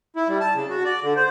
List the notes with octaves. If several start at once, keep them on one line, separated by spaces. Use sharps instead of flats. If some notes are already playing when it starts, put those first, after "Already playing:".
E4
G3
A5
C#3
F#4
D5
D3
C5